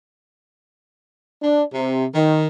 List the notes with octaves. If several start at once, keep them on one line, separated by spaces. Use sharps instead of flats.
D4
C3
D#3